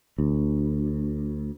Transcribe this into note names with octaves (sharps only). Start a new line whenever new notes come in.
D2